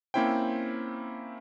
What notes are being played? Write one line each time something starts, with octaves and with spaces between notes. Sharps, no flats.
A#3 C4 C#4 E4 C5 G5